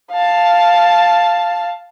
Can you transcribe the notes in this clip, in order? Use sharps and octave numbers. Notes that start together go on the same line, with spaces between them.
F5 A5